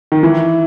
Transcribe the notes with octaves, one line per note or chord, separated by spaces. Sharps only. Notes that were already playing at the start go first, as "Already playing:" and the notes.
D#3
E3